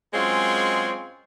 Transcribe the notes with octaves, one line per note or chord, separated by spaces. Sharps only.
F#2 G#3 C4 F4 G#4 C#5